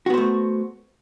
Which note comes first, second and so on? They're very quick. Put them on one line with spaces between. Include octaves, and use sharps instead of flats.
F#4 B3 C5 A3